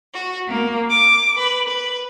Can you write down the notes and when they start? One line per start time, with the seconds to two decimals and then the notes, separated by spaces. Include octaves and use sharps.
0.13 F#4
0.48 A#3
0.88 D6
1.37 B4
1.67 B4